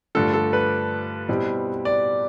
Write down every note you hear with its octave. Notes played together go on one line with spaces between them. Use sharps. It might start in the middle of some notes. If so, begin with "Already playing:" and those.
G2 D3 F3 A3 A4
A4
B4
B2 G3 C4 E4
D5